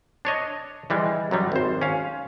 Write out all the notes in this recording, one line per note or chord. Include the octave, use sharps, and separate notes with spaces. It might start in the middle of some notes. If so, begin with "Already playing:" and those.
D4 C#5 D#5
E3 G3 G#3
F#2 F#3 G3
G#1 C5
C#4 F5